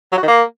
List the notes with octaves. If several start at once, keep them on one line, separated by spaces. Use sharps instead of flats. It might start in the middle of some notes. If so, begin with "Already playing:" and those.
F#3
F#4
D#3
A#3